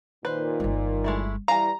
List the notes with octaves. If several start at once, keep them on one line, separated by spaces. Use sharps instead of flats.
A#2 D#3 B4 C5
G1 G3
G#3 A3 E4
E3 G3 F5 G#5 A#5